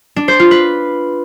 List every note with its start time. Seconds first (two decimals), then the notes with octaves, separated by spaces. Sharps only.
0.16 D4
0.28 C5
0.40 F4
0.51 B4